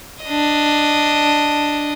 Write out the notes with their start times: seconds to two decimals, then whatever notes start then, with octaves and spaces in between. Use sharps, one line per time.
0.24 D4 D#5